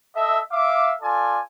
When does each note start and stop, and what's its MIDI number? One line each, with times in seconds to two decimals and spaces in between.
0.15 0.40 69
0.15 0.40 75
0.15 0.40 76
0.51 0.93 76
0.51 0.93 77
0.51 0.93 86
1.01 1.39 65
1.01 1.39 69
1.01 1.39 74
1.01 1.39 80